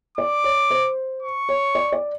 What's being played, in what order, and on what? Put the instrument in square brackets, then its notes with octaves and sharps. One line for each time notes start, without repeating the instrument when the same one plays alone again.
[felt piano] D5 [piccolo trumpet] D6
[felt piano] C#5
C5
[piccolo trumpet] C#6
[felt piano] C#5
D5
D5